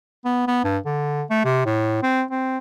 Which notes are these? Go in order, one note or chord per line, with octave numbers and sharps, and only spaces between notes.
B3
B3
G2
D3
A3
C3
A2
C4
C4